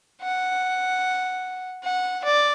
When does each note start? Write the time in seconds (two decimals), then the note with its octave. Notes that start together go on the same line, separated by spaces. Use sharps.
0.22 F#5
1.84 F#5
2.24 D5